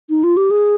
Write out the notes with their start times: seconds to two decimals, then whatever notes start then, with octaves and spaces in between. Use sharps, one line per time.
0.10 D#4
0.24 F4
0.37 G4
0.51 G#4